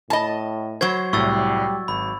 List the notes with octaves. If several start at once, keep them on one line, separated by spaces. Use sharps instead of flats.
A2 D#5 A5
F#3 C5 C#6 G#6
C2 A2 G3 C#6 E6 A6
G#1 B5